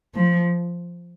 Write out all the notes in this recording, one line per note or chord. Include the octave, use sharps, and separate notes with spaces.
F3